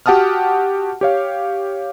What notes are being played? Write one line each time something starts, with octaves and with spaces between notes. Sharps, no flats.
F#4 G4 F#5 A5 D#6 F6
G4 C#5 F5